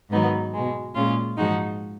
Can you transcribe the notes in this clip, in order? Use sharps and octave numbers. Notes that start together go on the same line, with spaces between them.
G#2 D#3 F#3 B3 D#4
B2 G#3
A#2 G#3 C#4 F4
G#2 F3 G#3 D#4 F#4